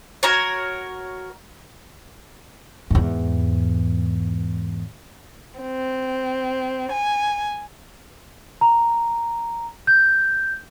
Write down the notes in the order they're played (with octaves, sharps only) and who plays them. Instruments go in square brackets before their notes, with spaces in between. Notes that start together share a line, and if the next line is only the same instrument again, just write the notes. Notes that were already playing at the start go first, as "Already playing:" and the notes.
[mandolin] F#4 A#4 C#5
[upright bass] E2 G#2
[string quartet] C4
G#5
[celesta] A#5
G6